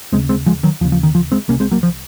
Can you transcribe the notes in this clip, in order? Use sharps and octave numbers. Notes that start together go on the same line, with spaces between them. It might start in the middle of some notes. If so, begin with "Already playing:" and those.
D#2 C#3 G#3 C4
G#3 C4
F3 G#3
D#3 F#3
D#2 C#3 F3
F3
D#3
F3
G#3 C4
C2 C3 A#3 C#4
G#3 C4
F#3 A#3
F3